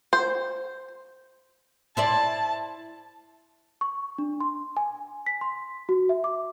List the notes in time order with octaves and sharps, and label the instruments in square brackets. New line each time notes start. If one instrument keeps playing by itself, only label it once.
[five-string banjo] C5
[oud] E4 C5 D5 [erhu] A5
[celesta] C#6
D4
C6
G#5
B6
C6
F#4
E5
D6